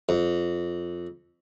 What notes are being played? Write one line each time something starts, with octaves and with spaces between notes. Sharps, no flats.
F2